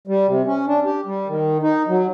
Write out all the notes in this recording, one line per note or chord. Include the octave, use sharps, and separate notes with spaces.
G3
C3
C#4
D4
G4
G3
D#3
D#4
F#3